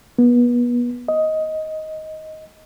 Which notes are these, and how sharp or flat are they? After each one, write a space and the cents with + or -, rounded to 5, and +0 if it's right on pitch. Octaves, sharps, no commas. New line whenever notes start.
B3 -30
D#5 +10